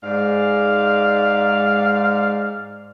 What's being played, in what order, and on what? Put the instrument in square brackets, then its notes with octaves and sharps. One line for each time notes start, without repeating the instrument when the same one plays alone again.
[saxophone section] G#2 D5 [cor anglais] F5